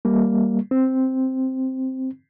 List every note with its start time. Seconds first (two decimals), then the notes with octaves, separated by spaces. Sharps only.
0.05 G3 A#3
0.71 C4